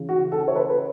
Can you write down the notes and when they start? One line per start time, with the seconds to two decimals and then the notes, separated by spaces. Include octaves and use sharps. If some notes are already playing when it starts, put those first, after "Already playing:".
Already playing: C#3 E3
0.09 F#4
0.32 A4
0.48 C#5
0.55 B4
0.69 B4